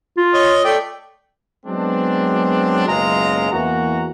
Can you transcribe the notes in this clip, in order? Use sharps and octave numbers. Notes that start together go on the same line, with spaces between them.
F4
C#5 D#5
A3 D5 G5
F#3 G#3 B3 C4 D4
F#1 F#2 B2 G#3 F4 A#5
E2 E3 A#3 F#4 A#5